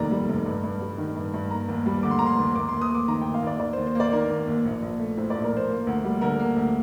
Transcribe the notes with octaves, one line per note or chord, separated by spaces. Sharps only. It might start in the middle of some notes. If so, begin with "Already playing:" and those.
Already playing: F1 D#2 D#3 G3 D5 A#5
G3
F1
G2
G2
G3
D#3
G2
G2
A#3 A#5
D#2
G3
D3 D6
C6
A#3 A#5
C6
D#2
D#2 D6
C6
D#2
D#6
A#3 D6
D#3 A#5
G5
D#2
F5
D#2 D5
D#2 D5
C5
D#2
C5
A#3 D5
D#3 A#4
D#2
D#2
A#1
A#1
A3
A2 C5
D5
A#1
A#4
A#1 C5
A#3
D2
G3
D3 A#4
A#3
D2